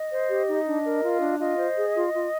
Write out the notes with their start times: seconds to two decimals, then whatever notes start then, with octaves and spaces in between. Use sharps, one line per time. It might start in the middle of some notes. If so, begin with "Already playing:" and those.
Already playing: D#5
0.12 C5
0.30 G4
0.48 D#4
0.66 D4
0.84 A#4
1.03 F4
1.21 D4
1.39 F4 D#5
1.58 C5
1.76 G#4
1.94 F4
2.12 F4